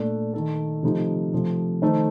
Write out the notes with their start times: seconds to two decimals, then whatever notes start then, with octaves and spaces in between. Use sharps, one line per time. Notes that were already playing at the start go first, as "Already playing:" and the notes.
Already playing: A#2 A3 D4
0.34 D#3 A3 D#4 A4
0.83 C3 F3 A3 D#4
1.33 C3 F3 A3
1.82 D#3 A3 D#4 A4 C5